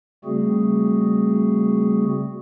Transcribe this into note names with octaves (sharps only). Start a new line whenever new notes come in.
C#3 G3 A3 C4 F#4 G#4